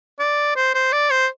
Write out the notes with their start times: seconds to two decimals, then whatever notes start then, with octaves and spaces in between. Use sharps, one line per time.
0.19 D5
0.56 C5
0.74 C5
0.92 D5
1.10 C5